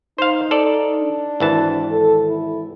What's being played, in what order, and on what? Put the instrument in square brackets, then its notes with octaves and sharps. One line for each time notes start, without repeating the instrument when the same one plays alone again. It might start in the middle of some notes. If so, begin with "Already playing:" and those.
[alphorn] D#4 [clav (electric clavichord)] C5 F5
[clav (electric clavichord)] A4 D5
[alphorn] D4
[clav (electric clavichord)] G#1 E3 A5
[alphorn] A4
E4